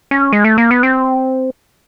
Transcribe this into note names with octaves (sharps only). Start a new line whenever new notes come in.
C#4
G#3
A3
A#3
B3
C4